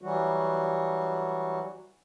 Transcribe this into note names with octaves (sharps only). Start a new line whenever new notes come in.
E3 F#3 G3 F#4